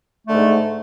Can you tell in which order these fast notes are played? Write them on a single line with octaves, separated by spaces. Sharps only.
A3 D3 G#2